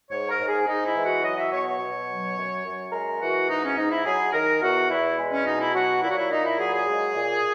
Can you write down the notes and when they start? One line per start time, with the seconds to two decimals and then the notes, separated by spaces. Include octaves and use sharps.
0.11 G#2 C#5
0.29 A#4
0.40 G#2
0.48 G#4
0.67 G#3 D#4
0.85 E4
0.95 E3
1.05 F#4
1.23 F#3 D#5
1.37 E5
1.51 B2 C#5
1.66 C#5
1.79 B2
2.08 F#3
2.36 F#2
2.64 F#2
2.92 G#3 A#4
3.20 E3 F#4
3.49 G#2 D#4
3.63 C#4
3.77 G#2 D#4
3.91 E4
4.05 F#3 G#4
4.33 D#3 A#4
4.61 E2 F#4
4.90 E2 E4
5.18 G#3
5.32 C#4
5.45 B2 D#4
5.61 E4
5.74 F#3 F#4
6.02 A#2 E4
6.09 F#4
6.17 E4
6.30 A#2 D#4
6.44 E4
6.58 F#3 G#4
6.73 G#4
6.87 G#3
7.15 A#2